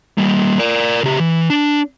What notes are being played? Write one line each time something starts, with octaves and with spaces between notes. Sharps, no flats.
G3 A#3
A#4 D5
C#3 G4
E3
D4